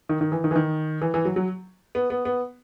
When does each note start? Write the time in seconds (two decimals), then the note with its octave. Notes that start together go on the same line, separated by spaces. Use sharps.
0.09 D#3
0.21 D#3
0.32 E3
0.44 D#3
0.51 E3
0.56 D#3
1.01 E3
1.14 E3
1.25 F#3
1.36 F#3
1.95 B3
2.10 B3
2.25 B3